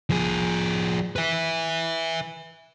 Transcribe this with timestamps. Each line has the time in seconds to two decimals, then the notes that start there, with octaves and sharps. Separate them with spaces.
0.10 F3 G#4
1.16 B4 E5